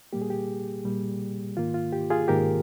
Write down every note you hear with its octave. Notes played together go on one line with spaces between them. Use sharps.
A#2 G3 A#3 G4
G#4
G4
A#2 G3 A#3
G#2 D#3 A#3 F4
F4
G4
F4 G#4
G#2 D#3 A#3 G4 A#4